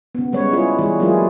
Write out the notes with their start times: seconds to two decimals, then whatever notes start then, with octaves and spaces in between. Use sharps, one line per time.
0.15 C#3 B3
0.33 C#3 G3 G#3 B4 C#5
0.53 G3 E4 F4 G#4 B4 C#5
0.79 E3 G3 G#4
0.99 F#3 G#3 A#3 E4 F4 G#4